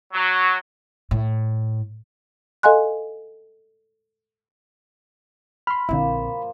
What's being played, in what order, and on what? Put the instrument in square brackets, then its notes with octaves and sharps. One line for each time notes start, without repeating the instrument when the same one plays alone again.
[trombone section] F#3
[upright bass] A2
[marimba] A4 D#5 F5 G#5 C6 F#6
[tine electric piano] B5 [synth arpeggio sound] C6 F6
[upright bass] A#1 C4 [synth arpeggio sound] D3 E4 [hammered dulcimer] F3 A#3 C5